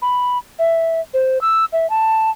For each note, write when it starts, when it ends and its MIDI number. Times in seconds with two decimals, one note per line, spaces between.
0.02 0.38 83
0.59 1.00 76
1.14 1.41 72
1.41 1.65 88
1.73 1.89 76
1.90 2.30 81